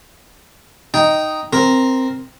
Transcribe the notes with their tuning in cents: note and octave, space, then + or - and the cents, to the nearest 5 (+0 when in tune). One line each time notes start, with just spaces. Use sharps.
D#4 +0 G5 -15
C4 +0 A#4 +0